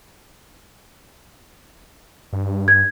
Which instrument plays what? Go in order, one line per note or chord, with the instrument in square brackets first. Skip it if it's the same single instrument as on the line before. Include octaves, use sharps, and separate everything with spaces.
[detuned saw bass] G2
[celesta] G#6